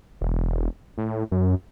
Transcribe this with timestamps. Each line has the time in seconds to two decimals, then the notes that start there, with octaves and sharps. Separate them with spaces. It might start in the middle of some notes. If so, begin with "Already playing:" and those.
0.21 E1
0.98 A2
1.32 F#2